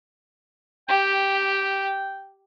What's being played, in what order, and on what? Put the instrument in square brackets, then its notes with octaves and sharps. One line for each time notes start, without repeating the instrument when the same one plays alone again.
[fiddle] G4 [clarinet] G5